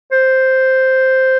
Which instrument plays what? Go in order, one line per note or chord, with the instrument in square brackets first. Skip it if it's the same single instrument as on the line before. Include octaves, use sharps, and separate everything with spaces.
[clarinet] C5